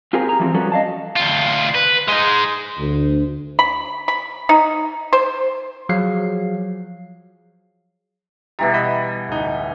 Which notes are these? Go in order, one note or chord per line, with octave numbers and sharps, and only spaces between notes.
C4 F4 G4 G#4 A#4 C5
G#4 A#5
E3 F3 B3 C4
F3 G3 C#4 F#4 A4 B4
D#5 F5 A5
D2 F4
B4
G#3 D#4
D2
B5
B5
D#4
C5
F3 F#3 G#4 F5 C7
B2 E3 G3 A#5
D#5 E5 B5
D1 D#4